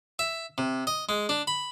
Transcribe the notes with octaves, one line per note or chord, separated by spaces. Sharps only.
E5
C3
D#5
G#3
D4
B5